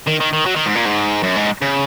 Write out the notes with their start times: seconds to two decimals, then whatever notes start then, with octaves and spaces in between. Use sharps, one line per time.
0.07 D#3
0.21 D#3
0.33 D#3
0.46 F#3
0.56 D#3
0.66 G#2
0.75 A#2
0.85 G#2
1.23 F#2
1.36 G#2
1.62 C#3